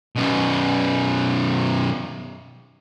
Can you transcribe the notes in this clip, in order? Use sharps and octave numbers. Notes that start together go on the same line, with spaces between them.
F#2 B2